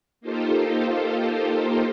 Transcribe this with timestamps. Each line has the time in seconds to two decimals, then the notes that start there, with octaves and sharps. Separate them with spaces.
0.21 A#3 D#4 F4 G4 A4 C5